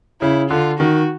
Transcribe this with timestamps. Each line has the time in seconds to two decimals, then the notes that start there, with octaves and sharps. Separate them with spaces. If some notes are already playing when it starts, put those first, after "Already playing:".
0.21 C#3 E4
0.50 D3 F4
0.79 D#3 F#4